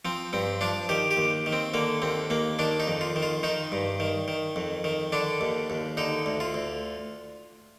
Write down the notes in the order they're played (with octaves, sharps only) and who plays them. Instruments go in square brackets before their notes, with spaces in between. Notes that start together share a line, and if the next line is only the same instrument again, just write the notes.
[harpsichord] F3 C4
G2 C4
F3 D4
D#3 G4
G4
D#2
D#3
C4
D3 A#3
D#2 C4
D#2 A#3
D#3 D4
D#4
F2
F4
D#3
F4
D#3 D#4
G2
D#3
D#3
F2
D#3
D3 D4
D#2
D#2
D3 D#4
D2
F4
D2